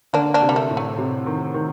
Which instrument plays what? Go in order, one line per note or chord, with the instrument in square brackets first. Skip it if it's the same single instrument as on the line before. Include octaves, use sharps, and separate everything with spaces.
[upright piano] D3 [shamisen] A#3 D4
[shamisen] A#3 D4
[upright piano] C3
[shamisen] G3
A3
[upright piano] A2
[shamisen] A3
[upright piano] C3
D#3
D#3